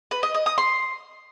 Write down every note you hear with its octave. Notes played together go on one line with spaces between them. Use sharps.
B4
D#5
D#5
D#6
C6